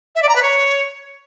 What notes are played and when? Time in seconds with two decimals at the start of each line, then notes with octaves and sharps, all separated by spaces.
0.15 E5
0.22 D5
0.29 A#5
0.35 B4
0.42 C#5